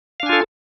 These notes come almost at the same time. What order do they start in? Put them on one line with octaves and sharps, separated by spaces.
F5 D4 G#5 F4 A4